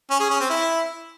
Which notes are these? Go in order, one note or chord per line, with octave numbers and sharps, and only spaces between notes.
C#4
G#4
C#4
C4
E4